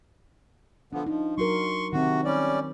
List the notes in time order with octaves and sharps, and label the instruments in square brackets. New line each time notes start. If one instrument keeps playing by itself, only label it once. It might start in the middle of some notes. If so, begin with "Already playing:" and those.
[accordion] D3 F3 B3 [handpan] D4
[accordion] F3 [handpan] D#4
[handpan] F#3 F#4 A#4 [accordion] C6 C#6
[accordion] C3 F#4 [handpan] D#3 C4
[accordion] G3 C#4 D5